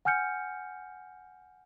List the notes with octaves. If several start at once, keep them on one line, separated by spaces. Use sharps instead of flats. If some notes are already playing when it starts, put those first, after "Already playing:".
F#5 G#5 F6 G6 C#7